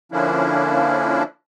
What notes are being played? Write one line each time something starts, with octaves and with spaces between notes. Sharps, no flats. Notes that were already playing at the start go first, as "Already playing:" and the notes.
D3 F3 A#3 C#4 D4 E4